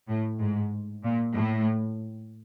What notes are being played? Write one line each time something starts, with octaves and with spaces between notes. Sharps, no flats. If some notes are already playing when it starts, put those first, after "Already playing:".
A2
G#2
A#2
A2